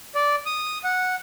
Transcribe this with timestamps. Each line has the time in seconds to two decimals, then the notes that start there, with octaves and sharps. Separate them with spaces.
0.15 D5
0.46 D#6
0.84 F#5